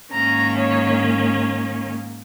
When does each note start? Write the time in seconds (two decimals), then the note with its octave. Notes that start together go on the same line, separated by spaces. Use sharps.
0.13 G#2 D#3 A#3 C#4 A#5
0.57 C#5